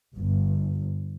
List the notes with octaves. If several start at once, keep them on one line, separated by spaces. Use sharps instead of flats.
G1